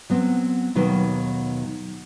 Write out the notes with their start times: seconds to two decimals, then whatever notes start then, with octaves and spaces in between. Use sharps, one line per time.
0.10 F#3 B3 C4
0.75 D#2 B2 D#3 F#3 B4